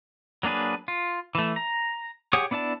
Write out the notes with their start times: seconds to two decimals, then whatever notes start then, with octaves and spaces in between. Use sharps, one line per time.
0.43 F#3 A#3 D4 G#4 B4
0.88 F4
1.35 E3 A3
1.56 A#5
2.33 G4 G#4 C#5 F#5 D#6
2.51 B3 D4 E4 D5 A5